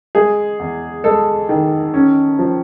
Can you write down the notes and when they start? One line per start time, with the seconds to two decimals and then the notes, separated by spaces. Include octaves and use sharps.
0.15 G#3 G#4
0.59 E2
1.04 G#3 A4
1.49 D#3
1.94 C#4
2.39 F3